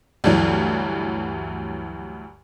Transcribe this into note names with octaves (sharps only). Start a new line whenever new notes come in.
D2 G2 E3 F#3